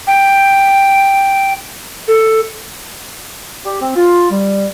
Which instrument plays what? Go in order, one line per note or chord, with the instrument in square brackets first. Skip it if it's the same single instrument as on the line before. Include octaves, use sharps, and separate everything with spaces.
[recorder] G5
A4
[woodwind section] G4
C4
F4
G3